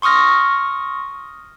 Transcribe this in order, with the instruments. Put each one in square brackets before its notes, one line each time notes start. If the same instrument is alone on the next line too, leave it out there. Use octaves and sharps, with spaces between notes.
[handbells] C6 C#6 D#6 F6 A#6